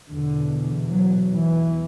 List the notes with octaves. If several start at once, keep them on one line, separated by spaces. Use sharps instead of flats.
E2 B2 D3
F#3
E3